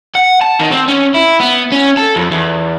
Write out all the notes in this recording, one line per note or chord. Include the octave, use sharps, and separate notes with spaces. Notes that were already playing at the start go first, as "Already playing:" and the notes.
F#5
A5
D#3
C4
C#4
E4
B3
C#4
A4
F2
E2